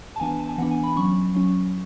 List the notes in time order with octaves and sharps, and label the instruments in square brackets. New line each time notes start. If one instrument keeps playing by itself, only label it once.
[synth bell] A5
E3 B3 D4 G#5
A5
G#5
E3 B3 D4 F#5
G#5
B5
F#3 C#4 C#6
F#3 C#4